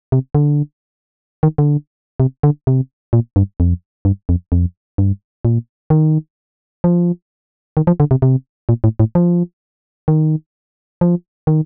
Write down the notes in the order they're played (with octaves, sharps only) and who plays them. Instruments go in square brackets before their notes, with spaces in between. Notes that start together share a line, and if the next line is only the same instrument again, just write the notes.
[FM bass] C3
D3
D#3
D3
C3
D3
C3
A#2
G2
F2
G2
F2
F2
G2
A#2
D#3
F3
D#3
F3
D3
C3
C3
A#2
A2
A2
F3
D#3
F3
D#3